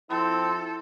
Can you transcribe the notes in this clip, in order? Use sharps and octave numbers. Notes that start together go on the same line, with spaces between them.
F3 C4 E4 A4